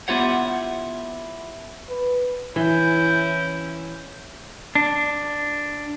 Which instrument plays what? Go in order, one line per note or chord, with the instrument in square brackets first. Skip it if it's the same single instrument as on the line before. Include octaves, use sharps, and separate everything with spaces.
[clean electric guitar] B3 E4 F4 G4 C#5 F#5
[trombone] B4
[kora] E3 [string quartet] C#4 E4 [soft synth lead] G6
[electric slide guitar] D4